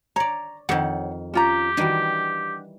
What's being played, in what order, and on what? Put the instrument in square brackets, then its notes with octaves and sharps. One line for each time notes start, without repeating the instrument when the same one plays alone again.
[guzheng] C#5 D5 [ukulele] A#5
[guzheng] F2 D#3 [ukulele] C5 C#5 F#5
[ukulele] C#4 F4 A#5 [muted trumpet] G4
[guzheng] D#3 E3 G3 [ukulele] D4 F#4